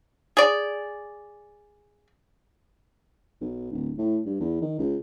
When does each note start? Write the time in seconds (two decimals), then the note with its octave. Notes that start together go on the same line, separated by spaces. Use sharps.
0.37 G#4 D5
3.41 B1
3.72 D1
3.98 A2
4.26 G2
4.40 E2
4.62 D#3
4.79 C#2